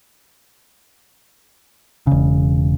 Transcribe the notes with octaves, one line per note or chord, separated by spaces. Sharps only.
E1 C#3